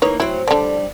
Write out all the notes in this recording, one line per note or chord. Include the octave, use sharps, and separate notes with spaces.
E3 A#3 D#4 B4 C#5
F#3 C4 E4
D3 E3 G3 D4